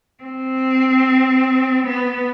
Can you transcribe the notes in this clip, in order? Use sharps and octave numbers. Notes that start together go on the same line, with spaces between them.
C4
B3